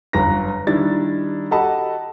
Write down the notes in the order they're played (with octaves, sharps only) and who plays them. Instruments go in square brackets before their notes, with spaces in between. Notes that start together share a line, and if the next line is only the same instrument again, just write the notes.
[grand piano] G1 F#2 B4 A#5 A#6
D#3 G3 D4 E4 A6
F#4 G4 A4 D#5 A5 B5